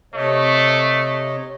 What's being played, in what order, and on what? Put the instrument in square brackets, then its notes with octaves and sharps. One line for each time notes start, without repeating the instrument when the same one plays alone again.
[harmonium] C3 C#5 D#5 [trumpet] A3